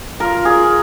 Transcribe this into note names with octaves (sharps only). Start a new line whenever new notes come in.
F4 A#4
G#4